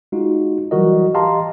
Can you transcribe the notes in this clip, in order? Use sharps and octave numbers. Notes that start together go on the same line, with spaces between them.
G#3 D#4 F4 F#4
E3 F#3 G3 F#4 A#4 D#5
G4 D#5 F5 A5 A#5 C6